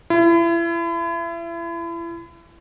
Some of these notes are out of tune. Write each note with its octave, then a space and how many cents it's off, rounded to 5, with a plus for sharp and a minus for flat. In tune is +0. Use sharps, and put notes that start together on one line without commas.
E4 +35